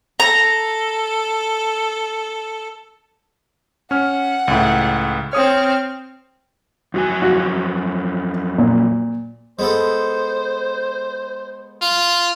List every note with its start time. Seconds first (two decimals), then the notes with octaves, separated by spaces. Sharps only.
0.20 A4 A#5
3.91 C#4 F#5 F6
4.48 C#2 A2
5.33 C4 C#5 D#6 F6
6.94 F2 F#3 F#4 G#5
7.22 F#4
8.58 A#2
9.59 G#3 B3 A4 C5
11.82 F4